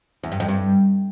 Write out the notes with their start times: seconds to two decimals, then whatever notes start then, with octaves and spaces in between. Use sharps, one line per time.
0.23 E2
0.32 G2
0.40 F2
0.48 G2